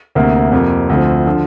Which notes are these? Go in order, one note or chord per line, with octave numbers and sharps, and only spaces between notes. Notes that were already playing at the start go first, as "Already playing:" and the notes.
D2 C3 A#3
F2 C3 A#3
D2 D3 F3 C4
D3 F3